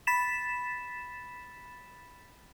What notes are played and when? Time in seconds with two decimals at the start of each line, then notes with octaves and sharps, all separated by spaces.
0.07 B5 A6 B6 E7